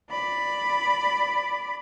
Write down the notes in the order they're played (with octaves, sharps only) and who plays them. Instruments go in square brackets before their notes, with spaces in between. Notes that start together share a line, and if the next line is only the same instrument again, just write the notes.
[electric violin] D5 B5